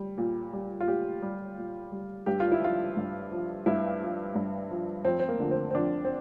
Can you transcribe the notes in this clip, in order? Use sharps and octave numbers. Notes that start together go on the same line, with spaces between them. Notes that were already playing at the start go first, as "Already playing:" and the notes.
Already playing: G3
A#2
G3
F4
A#2 G4
G3
A#2
G3
G2 G4
F4
E4
F3 F4
G2
F3
G2 E4
F3
G2
F3
F2 C4
C4
A#3
D3 F3
C4
C4
F2 D4
C4